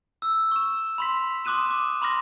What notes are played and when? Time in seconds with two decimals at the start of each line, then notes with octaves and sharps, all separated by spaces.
0.22 E6
0.52 C#6 E7
0.98 B5 C6 B6
1.45 C6 D6 D#6 F#6 D#7 E7
1.71 D6
2.02 B5 C6 D6 F6 A#6